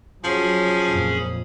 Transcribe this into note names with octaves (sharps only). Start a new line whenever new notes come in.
F3 F#3 C#4 G#4 B5
F2 A#2